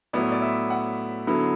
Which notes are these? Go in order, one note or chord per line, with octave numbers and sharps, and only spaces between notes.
A2 F#3 B3 E4 D5
D5
E5
F#5
D3 F#3 B3 E4